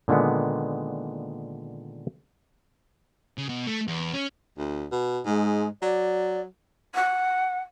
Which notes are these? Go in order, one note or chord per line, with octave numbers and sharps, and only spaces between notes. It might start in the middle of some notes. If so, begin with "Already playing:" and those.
A#2 D3 D#3 G#3 B3
C#3
B2
A3
E2
C#4
D2
B2
G#2 G#3
F#3 D5
F#5